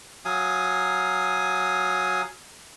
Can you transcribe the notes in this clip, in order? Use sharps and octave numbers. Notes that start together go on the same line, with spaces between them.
F#3 F5 G#5 D#6